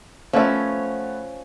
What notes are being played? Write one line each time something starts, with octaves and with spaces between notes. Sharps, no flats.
F3 A3 B3 C#4 E5